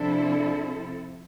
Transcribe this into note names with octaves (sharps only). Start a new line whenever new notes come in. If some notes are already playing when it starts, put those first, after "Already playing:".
Already playing: C3 F3 C4 D4 E4 A4